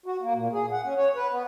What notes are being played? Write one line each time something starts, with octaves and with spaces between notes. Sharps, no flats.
F#4
A#3
A#2
G#4
F#5
C#4
C#5
B4
B3